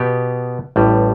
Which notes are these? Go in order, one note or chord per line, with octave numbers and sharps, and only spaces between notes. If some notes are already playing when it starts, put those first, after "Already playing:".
Already playing: B2 B3 G4
A1 A2 G3